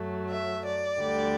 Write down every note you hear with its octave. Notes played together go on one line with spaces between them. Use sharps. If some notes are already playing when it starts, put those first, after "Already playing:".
Already playing: F#2 F#3 A3
E5
D5
D2 D3 G3